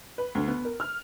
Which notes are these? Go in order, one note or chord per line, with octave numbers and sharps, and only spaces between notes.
B4
D2
B3
A#4
F6